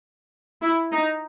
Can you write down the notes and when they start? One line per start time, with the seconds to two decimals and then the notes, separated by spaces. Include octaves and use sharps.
0.62 E4
0.92 D#4